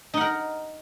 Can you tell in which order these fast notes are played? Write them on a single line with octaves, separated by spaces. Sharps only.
D#4 F#5 A#4